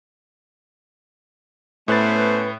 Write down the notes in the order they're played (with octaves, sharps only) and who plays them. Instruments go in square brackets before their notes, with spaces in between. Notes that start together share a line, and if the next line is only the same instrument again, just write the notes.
[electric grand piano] A2 F#6 A6 [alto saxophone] A3 [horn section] B3 C#4 C5 [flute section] B4